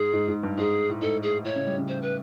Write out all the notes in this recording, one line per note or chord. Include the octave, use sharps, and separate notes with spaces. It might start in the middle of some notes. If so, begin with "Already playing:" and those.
Already playing: G#2 G#4
G#2
G#2
G2
G#2 G#4
A2
G#2 A4
G#4
A2 C#5
C#3
G3
C#3
C5
B4